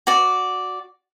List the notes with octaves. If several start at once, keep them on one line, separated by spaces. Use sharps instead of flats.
F#4 D5